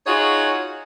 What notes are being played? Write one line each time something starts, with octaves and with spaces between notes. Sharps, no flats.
D#4 F4 F#4 G#4 C#5